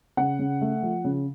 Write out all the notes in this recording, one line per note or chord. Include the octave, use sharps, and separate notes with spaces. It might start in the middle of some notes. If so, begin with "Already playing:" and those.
C#3 F#5
C#3
A3
F3
C#3